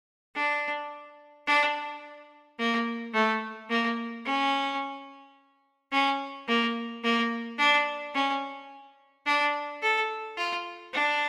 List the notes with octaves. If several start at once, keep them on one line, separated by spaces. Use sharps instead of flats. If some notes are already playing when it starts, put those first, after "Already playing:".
D4
D4
A#3
A3
A#3
C#4
C#4
A#3
A#3
D4
C#4
D4
A4
F4
D4